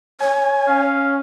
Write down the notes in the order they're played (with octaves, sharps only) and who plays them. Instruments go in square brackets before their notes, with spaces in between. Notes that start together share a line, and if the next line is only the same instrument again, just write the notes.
[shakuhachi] C#5 [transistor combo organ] G#5
[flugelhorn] C#4 [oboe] F5